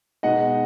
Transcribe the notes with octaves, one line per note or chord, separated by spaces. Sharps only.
B2 G#3 D#4 D#5 F#5